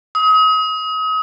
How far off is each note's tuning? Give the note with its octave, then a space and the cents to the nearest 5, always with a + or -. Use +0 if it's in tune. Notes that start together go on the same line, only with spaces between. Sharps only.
D#6 +35